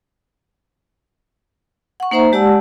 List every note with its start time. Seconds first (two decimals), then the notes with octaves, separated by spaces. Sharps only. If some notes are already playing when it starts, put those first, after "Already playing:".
2.00 F#5 C#6
2.11 A#3 D#4 C5 E5 A#5
2.32 G#3 G4 D5 F#5 A5 E6